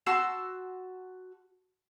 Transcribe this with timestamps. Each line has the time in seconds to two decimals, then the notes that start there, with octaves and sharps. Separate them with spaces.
0.06 F#4 A5 C6 E6